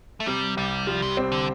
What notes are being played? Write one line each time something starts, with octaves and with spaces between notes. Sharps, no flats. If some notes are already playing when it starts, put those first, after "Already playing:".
A3
C3 G3
C2 G3
F3 G3
C3
C4
D3